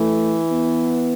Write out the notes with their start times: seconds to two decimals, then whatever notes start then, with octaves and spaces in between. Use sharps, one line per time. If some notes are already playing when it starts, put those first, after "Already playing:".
Already playing: E3 A3
0.51 B3